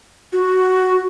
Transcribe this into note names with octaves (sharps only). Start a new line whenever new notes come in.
F#4